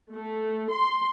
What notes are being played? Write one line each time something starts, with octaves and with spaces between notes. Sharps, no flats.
A3
C6